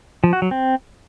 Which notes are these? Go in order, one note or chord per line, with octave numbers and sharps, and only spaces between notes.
F3
F#4
F#3
C4